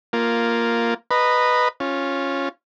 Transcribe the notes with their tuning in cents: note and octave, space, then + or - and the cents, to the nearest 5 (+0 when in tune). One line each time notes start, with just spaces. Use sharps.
A#3 +0 F4 +0
B4 +0 D#5 -15 A#5 -10
C#4 -15 F4 +0